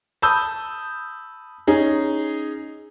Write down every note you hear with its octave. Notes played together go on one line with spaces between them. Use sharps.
A5 B5 D#6 E6 G6
C#4 D#4 G#4